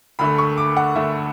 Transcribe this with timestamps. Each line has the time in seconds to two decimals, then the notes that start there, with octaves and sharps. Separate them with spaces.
0.19 D2 D3 A3 B5
0.38 C#6
0.58 D6
0.77 F#5
0.95 D2 D3 A3 E5